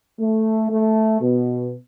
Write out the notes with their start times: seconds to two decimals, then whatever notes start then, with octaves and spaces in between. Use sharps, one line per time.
0.20 A3
0.71 A3
1.21 B2